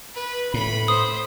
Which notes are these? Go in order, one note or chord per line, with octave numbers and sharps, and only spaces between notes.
B4
A2 B5
C5 D#6